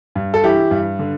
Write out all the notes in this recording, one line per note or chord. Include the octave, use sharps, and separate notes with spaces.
G2
A4
E3 E4 G4
G2
D3